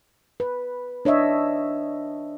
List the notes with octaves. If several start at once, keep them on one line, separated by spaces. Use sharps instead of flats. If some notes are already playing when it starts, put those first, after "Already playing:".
B4
D4 C#5 D#5 E5